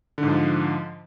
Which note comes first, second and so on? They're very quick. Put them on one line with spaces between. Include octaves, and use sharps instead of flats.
D3 G#2 F3